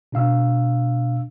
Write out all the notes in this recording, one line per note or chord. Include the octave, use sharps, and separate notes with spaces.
B2 D4 F5 E6